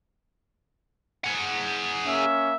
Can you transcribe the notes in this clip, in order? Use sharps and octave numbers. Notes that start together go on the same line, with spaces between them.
G#4 F#5
A#3 C#4 E5